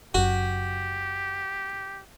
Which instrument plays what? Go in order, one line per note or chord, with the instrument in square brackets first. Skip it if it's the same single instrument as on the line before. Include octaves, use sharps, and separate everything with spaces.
[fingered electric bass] F#1 F#2 [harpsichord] F#4 [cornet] G4